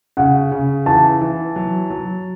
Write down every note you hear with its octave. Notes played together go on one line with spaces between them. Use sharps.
C#3 F#5
C#3
E3 A5
E3
F#3
F#3